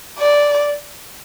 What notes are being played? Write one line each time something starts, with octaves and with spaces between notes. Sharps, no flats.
D5